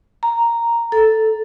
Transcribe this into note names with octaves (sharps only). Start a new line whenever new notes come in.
A#5
A4